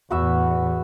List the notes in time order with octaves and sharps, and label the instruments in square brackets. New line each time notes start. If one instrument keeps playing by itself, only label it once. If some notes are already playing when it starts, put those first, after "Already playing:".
[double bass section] E2 A2 [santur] F#4 B4 E5